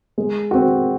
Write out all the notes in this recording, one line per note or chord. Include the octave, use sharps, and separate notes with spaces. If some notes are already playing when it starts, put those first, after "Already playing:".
G#3
C4 F#4